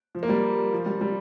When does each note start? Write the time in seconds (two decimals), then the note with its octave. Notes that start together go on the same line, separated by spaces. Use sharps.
0.15 F3
0.23 A#3
0.29 G3
0.73 F3
0.86 G3
1.01 G3